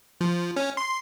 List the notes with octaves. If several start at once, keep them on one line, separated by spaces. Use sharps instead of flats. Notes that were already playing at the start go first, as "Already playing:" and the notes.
F3
C#4
C6